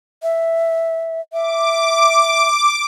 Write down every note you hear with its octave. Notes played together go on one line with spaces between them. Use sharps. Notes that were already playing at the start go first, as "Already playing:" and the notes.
E5
E5 D6